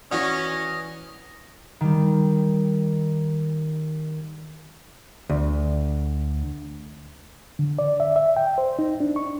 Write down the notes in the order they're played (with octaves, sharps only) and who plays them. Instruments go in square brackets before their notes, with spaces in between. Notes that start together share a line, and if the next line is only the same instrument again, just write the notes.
[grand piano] E3 F#4 D5 [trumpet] C#4 [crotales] D#6 A#6
[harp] D#3 G3
[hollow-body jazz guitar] D2
[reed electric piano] D3
D5
E5
E5
G5
C5
D#4
D4
C#6